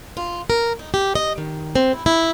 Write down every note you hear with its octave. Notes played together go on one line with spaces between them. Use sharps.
F4
A#4
D#4
G4
D#5
D#3
C4
E4
E4